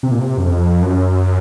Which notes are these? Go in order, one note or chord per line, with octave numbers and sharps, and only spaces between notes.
C3
A#2
C3
F#2
F2
F#2